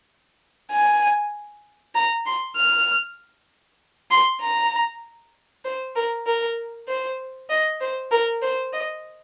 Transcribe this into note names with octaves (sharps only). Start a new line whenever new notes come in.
G#5
A#5
C6
F6
C6
A#5
C5
A#4
A#4
C5
D#5
C5
A#4
C5
D#5